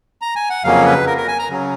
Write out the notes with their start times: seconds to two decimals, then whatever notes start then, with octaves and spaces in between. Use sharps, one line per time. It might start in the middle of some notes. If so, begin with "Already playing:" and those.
0.22 A#5
0.36 G#5
0.50 F#5
0.64 F2 C#3 F#3 A#3 C#4 F5
0.86 B4
1.07 A#4
1.17 A#4
1.28 G#5
1.39 A#5
1.49 C#3 F#3 C#4